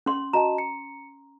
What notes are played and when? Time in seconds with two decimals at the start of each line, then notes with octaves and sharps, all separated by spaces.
0.06 C#4 C6
0.33 F#4 D#5 A5 A#5
0.58 C#7